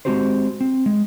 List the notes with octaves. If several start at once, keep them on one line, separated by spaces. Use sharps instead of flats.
G#3 A3 C4 F#4 G4 C5
C4
G#3